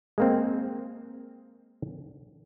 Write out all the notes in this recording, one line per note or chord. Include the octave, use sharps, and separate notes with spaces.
G#3 A#3 C4